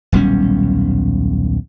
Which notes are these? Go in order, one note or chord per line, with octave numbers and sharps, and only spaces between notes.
D#1 B1 G3 C#4